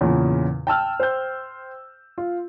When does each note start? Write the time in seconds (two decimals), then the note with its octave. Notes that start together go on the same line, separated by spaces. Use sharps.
0.01 E2 A#2 C#3
0.67 G5 A5 E6 F6
1.00 C5 G5 G6
2.18 F4